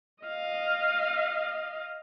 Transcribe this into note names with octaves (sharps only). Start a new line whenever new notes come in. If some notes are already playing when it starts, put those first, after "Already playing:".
D#5 F5